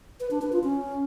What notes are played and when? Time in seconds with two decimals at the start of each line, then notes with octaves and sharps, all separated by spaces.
0.20 B4
0.31 D4
0.42 B4
0.53 F4
0.63 C#4